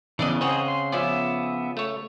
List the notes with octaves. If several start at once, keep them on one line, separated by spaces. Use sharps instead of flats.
C#3 E3 B3 D4 D5 D#5
C4 G#4 C5 C#5 D#5 F#5
C6
F3 B3 C#4 D5 E5
A3 C#5